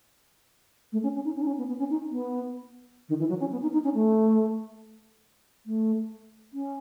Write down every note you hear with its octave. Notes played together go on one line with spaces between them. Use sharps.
A3
C#4
C#4
D#4
C#4
D#4
C#4
B3
B3
C#4
D#4
B3
D#3
E3
F#3
C#4
B3
D#4
D#4
C#4
A3
A3
C#4